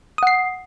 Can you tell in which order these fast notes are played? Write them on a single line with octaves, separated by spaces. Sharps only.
D#6 F#5 C7